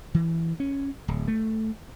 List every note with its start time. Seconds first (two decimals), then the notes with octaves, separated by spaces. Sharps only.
0.14 E3
0.60 C#4
1.08 D1
1.28 A3